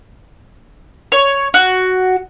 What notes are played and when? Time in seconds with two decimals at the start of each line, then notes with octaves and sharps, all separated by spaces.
1.12 C#5
1.54 F#4